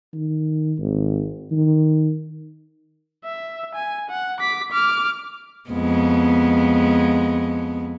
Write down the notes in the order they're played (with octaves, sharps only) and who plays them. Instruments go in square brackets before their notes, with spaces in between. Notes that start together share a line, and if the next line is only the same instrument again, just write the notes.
[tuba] D#3
G#1
D#3
[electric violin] E5
G#5
F#5
D6 B6
D6 F6
[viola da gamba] F2 G#3 B3